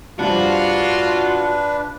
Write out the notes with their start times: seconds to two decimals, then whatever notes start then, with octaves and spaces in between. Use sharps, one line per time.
0.19 G2 C3 F3 D4 F4 F#4 B4